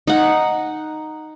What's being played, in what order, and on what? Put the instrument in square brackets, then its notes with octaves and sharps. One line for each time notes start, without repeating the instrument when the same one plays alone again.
[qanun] D#4 F#5